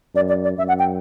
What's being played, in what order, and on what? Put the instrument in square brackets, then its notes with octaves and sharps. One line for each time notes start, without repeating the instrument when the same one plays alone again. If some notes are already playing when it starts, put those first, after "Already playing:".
[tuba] F#2 [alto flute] D5
[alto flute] D5
D5
[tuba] F#2 [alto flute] E5
[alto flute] F#5
G5